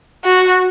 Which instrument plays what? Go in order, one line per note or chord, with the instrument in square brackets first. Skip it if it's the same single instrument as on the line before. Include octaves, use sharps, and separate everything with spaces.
[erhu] F#4